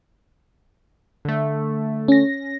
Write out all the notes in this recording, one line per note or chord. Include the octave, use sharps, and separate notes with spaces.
D3 A3
C#4 A#6